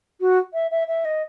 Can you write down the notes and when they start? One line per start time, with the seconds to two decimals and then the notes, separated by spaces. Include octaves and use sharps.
0.21 F#4
0.53 E5
0.71 E5
0.88 E5
1.05 D#5